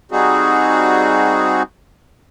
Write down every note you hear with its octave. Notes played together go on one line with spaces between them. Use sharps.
G3 C4 D#4 F#4 G#4